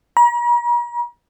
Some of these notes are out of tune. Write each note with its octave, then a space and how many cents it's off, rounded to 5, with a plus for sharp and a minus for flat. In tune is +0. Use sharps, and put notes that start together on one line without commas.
A#5 +45